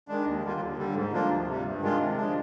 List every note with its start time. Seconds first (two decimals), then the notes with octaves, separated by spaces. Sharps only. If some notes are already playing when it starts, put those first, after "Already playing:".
0.08 D#3 G#3 D4
0.26 D#2
0.43 D3 G3 A#3 F4
0.60 D#2
0.77 D3 G3
0.95 G#2
1.13 F3 A#3 D4 F4
1.30 D2
1.47 C3 G3
1.64 G2
1.82 D#3 G#3 D4 F4
1.99 C3
2.16 F3 G#3 D4